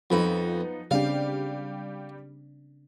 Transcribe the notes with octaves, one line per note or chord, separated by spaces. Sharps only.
F2 F3 B3 D#4 B5
C#3 G3 C4 D4 G4 F5